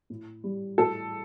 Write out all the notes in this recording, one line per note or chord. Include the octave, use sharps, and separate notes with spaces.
A2
G3
A2 A4